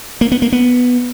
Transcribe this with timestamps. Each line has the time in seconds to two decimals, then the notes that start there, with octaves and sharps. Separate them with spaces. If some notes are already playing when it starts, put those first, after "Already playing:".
0.21 A#3
0.32 B3
0.42 A#3
0.52 B3